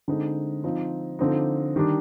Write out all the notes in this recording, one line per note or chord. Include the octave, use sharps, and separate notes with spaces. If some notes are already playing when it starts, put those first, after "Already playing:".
D3 G#3 C4 D#4
F3 C4 D#4
D3 F3 C4 D#4
D#3 G3 D4